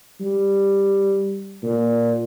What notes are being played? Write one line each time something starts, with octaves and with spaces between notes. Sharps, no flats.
G3
A#2